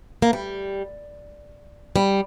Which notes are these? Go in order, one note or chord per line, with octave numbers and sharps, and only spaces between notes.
A#3
G3
G3